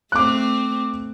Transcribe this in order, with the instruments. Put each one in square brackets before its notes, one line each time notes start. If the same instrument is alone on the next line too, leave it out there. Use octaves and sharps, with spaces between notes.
[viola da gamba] A3 C4 [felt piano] D6 F#6